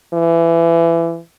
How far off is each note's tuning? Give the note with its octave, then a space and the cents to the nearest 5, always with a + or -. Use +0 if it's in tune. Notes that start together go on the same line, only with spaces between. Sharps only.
E3 +25